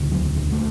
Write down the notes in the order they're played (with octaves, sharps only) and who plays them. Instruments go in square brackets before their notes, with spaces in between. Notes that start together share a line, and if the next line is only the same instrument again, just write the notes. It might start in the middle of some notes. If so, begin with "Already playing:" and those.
Already playing: [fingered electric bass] E1 D2 C#3
F#3
A3